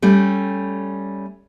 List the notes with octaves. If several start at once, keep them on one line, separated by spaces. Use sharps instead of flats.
G3 A3 C#4